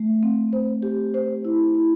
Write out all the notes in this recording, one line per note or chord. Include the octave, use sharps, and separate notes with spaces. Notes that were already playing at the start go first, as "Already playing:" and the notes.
Already playing: A3
C4
C5
G4
C5
E4
E4